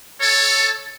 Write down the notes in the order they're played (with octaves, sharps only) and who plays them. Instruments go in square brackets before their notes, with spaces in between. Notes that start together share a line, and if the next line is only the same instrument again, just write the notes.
[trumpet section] A4 C#5